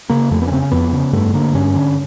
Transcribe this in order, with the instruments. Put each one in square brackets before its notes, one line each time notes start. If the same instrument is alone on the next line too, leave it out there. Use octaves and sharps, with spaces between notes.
[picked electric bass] C#3 A#3
F2 A3
B3
C#4
C#3 C4
C#4
F2 B3
C#3
G2 A3
D3 A#3
G2 C#4
D3